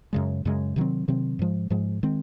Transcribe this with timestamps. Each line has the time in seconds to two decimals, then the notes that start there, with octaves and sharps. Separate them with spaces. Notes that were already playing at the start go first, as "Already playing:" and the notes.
0.13 F#2 C#3 G#3
0.45 F#2 C#3 G#3
0.76 C3 D#3 F#3 C4
1.08 C3 D#3 F#3 C4
1.39 G#2 F3 G#3
1.70 G#2 F3 G#3
2.03 D#3 G#3 C4